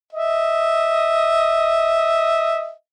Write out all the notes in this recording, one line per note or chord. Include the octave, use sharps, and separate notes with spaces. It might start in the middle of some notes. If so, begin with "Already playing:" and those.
D#5 E5